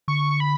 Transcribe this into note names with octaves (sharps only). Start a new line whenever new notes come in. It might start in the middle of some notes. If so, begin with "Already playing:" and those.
D3 C#6
B5